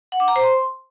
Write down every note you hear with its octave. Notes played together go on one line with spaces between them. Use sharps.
F#5
D6
A#5
C5
C6